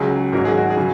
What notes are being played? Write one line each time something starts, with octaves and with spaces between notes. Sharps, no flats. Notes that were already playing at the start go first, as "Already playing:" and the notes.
Already playing: C#2 C#3 F#3 G#4
G#1 G#2 F#3 A#4
G#4
F#4
G#4
C#3 F#3